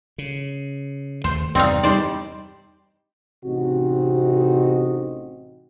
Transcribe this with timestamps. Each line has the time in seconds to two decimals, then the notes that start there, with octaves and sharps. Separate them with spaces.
0.18 C#3
1.24 D#2 A3 C5
1.55 E2 G2 C3 C4 D#4 D5 F5
1.83 G3 D#4 C5 D5
3.45 A1 C3 C4 D#4 F#4